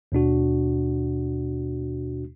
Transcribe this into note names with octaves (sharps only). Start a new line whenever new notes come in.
D#2 B2 D4 F#4